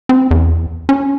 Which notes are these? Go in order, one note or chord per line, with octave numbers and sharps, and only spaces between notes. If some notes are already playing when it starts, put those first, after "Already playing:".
C4
E2
C#4